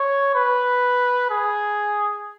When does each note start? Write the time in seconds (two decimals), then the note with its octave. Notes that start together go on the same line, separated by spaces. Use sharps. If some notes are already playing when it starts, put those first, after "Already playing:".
Already playing: C#5
0.35 B4
1.30 G#4